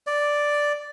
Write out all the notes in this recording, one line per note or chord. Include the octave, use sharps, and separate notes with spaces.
D5